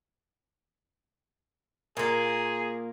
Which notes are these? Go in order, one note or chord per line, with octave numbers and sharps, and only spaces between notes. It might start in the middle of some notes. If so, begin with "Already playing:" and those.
A#2 A#3 G#4